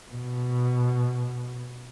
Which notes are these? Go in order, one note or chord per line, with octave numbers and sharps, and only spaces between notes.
B2